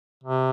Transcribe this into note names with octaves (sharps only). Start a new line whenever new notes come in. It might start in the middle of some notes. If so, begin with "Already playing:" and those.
C3